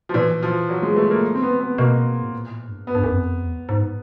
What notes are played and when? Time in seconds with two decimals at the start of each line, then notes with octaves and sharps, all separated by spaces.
0.09 F3
0.14 A#2 E3
0.43 F3
0.69 F#3
0.83 G#3
0.97 A3
1.10 A#3
1.34 C4
1.42 B3
1.60 B3
1.78 B2 A#3
2.22 A2
2.33 A#2
2.50 A2
2.68 G2
2.87 F#2 B3
2.95 G2
3.04 F#2
3.14 F2
3.42 E2
3.69 G#2